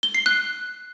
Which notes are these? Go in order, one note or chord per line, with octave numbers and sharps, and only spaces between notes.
G7
C7
F#6